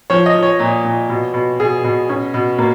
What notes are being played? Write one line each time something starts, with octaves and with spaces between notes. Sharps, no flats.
F3 C#5
D#5
F3
C#5
A#2
A#2
B2
B2
B2 G#4
B2
B2 C#4
B2
B2 A#3